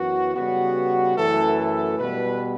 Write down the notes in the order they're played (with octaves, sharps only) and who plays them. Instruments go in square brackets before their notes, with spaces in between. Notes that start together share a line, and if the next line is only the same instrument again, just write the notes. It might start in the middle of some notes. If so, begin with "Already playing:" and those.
Already playing: [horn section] F#2 E3 B3 F#4
C#3 G3 B3 F#4
F#2 E3 A3 A4
A4
B2 G3 B3 B4